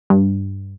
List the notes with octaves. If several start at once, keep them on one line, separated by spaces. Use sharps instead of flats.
G2